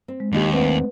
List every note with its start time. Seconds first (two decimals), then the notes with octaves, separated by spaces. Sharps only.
0.08 C4
0.20 G#3
0.32 D#2 D4 D#4 G4
0.53 A3 C4 D4 B4 F#5